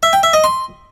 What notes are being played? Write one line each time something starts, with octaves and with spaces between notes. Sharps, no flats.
E5
G5
E5
D#5
C6